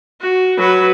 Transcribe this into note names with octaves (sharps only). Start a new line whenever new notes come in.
F#4
F#3 B4